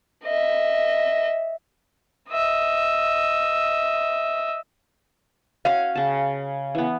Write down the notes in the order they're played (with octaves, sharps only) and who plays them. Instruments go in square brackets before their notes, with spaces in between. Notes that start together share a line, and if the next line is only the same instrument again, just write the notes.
[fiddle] D#5 E5
[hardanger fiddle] D#5 E5
[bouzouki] C#4 F5 [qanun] F#4
[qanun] C#3 A5
E3 B3